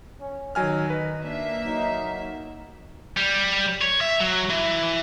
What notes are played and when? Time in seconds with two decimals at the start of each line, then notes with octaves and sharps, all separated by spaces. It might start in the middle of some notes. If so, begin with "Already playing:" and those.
0.20 C#4
0.55 D#3 F#3 D#4 G#5 F6
0.90 D#4 B4
1.24 A#3 D4 E5
1.65 F#3 D#4
3.17 G3
3.82 C#5
4.01 E5
4.20 F#3
4.50 E3